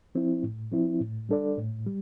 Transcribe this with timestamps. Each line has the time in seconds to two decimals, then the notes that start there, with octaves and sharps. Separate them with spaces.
0.15 F3 C4 E4
0.43 A2
0.72 F3 C4 E4
1.01 A2
1.29 G3 D4 A4 D5
1.57 A2
1.86 G3